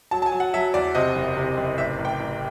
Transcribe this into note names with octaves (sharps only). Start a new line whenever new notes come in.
F#3 A5
A5
G#5
F#3
F#5
F#3 E5
E2 D5
C3 D#5
F#1
C3
F#1
A1 E5
A1
G5
A1